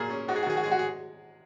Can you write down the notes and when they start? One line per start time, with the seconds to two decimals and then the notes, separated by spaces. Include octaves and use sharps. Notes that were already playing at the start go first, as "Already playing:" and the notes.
Already playing: A#2 A#3 G#4 A#4
0.10 C#4
0.28 G#2 F#4
0.36 G#4
0.43 F#4
0.46 D#3 G#4
0.57 F#4
0.64 G#3 G#4
0.71 F#4
0.79 G#4